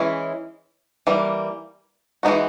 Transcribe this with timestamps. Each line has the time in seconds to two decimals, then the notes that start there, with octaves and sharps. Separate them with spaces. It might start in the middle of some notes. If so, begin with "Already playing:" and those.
Already playing: E3 G#3 C#4 E4
1.07 E3 G3 A#3
2.23 E3 G#3 C4 D#4 F#4